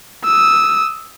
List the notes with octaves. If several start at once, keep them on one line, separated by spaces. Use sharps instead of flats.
D#6 E6